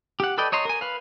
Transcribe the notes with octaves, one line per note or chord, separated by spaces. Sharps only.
G4 F#5
A4 B4 D5 D#5 G5
C#5 D#5 A#5 C6
A#4 G#5
B4 F5